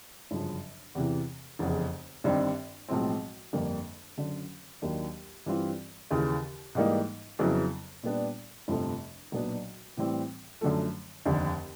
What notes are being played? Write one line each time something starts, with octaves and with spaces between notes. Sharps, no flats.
G1 F#2 C#3 F3
E2 C3 E3
F1 E2 C#3
G1 G2 D#3 G3 C4
B1 A2 F3 G#3 C4
G1 F2 D3 G3 A#3
F#1 F#2 D3
D#2 D#3 F#3 A#3 D4
G2 E3 G3 C4 F4
D#2 C#3 E3
G#2 E3 G3 A#3 D#4
F2 C#3 F#3 B3 E4
A#2 G3 B3 D4
G1 F2 C3 F3 A3
B1 A#2 F#3 B3 D4
A2 E3 G3 C4
F#2 D3 F3 A3
F1 D#2 D3